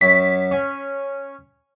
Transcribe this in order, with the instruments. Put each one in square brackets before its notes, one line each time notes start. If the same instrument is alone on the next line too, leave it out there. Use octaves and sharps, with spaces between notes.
[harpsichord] F#2 F#3 [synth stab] B6
[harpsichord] C#4 G#5